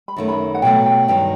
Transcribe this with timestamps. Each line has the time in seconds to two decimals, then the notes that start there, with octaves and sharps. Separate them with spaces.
0.08 B5
0.16 F#2 D#3 A3
0.28 B5
0.55 F#5
0.62 B2 F#3 A3 G5
0.86 G5
1.08 G2 D#3 F#3 G5